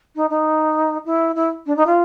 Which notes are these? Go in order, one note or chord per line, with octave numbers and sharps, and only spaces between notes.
D#4
D#4
E4
E4
D4
D#4
F4